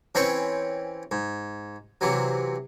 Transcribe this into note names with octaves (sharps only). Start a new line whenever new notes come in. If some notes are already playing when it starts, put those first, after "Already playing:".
E3 C4 C#4 G5 B5 C#6
G#2
C3 E3 F#3